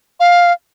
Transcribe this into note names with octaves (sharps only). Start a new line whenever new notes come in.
F5